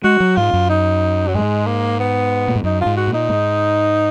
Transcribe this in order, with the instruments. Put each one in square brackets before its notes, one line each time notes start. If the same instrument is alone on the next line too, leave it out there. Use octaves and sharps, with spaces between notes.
[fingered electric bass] G#3 [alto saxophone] F#4
[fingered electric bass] F#3
[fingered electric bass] G#2 [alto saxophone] F4
[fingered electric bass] F#2
[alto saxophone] D#4
F#3
[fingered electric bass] G#2 [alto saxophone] G#3
[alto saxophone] A#3
B3
[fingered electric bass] A#2
G#2
[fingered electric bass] F#2 [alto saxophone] D#4
[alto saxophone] F4
[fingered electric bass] G#2
[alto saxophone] F#4
[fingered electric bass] A#2
[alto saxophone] D#4
[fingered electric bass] G#2